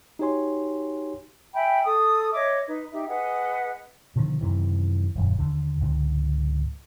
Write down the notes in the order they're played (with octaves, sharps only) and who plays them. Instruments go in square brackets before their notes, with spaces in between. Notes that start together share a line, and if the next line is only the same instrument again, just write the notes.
[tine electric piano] D#4 F#4 G4 C#5 G#5 C6
[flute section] E5 G5 G#5 B5
A4 D#6
C#5 D#5 E5 D6
D#4 B4
D#4 G4 E5
G#4 B4 D#5 F#5
[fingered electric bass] B2 D3 D#3 F3
F#2 C3 D#3 E3
D#1 F#2 D#3
D#2 D3
C#2 G#2 D3